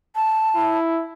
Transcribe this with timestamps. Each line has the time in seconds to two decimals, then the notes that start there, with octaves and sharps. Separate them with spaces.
0.16 A5
0.55 E4